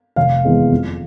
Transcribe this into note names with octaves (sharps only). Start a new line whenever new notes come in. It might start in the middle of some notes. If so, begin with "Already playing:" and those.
F1 F5
E2 E3 G#3 C4
F2